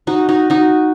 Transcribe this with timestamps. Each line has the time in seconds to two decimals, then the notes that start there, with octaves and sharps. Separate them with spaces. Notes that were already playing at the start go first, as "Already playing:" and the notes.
0.07 D#4 F#4
0.29 D#4 F#4
0.50 D#4 F#4